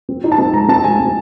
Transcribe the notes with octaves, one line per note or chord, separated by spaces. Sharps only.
C4
D#4
A5
C4
G#3 A#5
C4 A5
G#3 G#5
C4